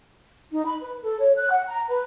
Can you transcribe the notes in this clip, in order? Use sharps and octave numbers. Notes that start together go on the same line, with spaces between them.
D#4
B5
B4
A4
C#5
F#6
F#5
A#5
B4